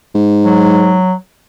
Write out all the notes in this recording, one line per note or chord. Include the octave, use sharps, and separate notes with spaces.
G#2
F#3